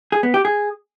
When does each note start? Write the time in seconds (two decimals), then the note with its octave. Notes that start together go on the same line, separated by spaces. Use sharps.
0.12 G#4
0.23 B3
0.34 G4
0.45 G#4